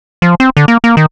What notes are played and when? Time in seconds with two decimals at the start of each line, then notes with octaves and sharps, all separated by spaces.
0.22 F3
0.40 C4
0.57 D3
0.68 A#3
0.84 A#3
0.97 D#3